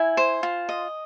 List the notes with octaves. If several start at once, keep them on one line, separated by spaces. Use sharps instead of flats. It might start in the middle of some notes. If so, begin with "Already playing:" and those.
Already playing: E4 G#5
C5
F4
D#5